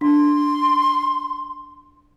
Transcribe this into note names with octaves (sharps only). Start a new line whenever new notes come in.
D4 C6